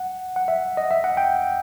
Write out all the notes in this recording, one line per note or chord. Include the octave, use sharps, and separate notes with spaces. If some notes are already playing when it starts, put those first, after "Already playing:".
Already playing: F#5
F#5
E5
D#5
E5
F#5
G5